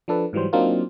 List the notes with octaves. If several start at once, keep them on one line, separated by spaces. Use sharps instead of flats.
F3 D4 A4 B4
G#2 E3 F#3 G3 C5
F#3 A#3 C4 D4 D#4 F4